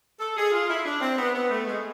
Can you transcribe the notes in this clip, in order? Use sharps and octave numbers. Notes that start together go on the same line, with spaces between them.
A4
G#4
F4
E4
D4
C4
B3
B3
A3
G#3